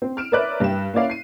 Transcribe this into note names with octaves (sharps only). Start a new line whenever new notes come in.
C4
F6 D7 E7
A#4 B4 C#5 D5 E5 F#6
G2 G4 E7
A#3 C#4 E4 D5 F5
C7 D#7